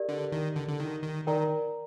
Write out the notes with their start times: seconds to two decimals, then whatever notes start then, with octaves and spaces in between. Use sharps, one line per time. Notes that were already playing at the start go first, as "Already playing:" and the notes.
Already playing: G4 A#4 D5
0.09 D3
0.32 D#3
0.56 D3
0.68 D3
0.80 D#3
1.03 D#3
1.27 D#3 A#4 D5 G5 A#5